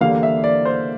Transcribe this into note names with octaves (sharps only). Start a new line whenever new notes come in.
E2 D3 G3 A#3 F5
E5
D5
C5